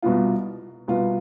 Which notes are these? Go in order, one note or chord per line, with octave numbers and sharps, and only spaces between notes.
C2 B2 B3 F4
C2 B2 B3 F4